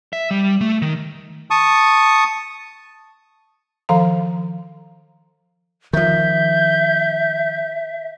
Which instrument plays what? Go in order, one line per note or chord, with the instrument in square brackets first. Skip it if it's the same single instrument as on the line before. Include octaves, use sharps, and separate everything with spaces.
[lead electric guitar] E5
G3
A3
D#3
[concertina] A5 C#6 D#6
[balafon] D#3 F3 F5 A#5
[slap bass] D#3 F3 [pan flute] E5 [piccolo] G6